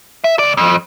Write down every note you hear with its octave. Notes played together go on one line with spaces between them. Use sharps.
E5
C#2 D5
F2